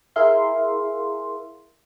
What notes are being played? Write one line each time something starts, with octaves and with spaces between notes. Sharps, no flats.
E4 G#4 A#4 E5 F5 C6